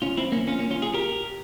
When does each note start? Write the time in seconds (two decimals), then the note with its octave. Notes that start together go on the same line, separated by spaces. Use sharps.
0.02 C#4 F4
0.17 C4 E4
0.32 A#3 C#4
0.47 C#4 F4
0.59 A#3 C#4
0.71 C#4 F4
0.82 F4 G#4
0.94 G4 A#4